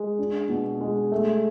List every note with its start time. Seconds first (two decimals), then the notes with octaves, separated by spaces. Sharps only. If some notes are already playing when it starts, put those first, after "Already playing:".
Already playing: G#3
0.19 D4
0.49 B2
0.81 G#3
1.12 A3